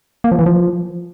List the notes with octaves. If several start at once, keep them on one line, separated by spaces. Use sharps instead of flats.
A#3
F3
E3
F3